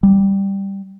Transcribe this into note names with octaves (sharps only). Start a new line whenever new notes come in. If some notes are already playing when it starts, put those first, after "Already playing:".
G3